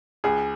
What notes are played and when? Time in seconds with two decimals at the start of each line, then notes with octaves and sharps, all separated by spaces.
0.24 C#2 G#4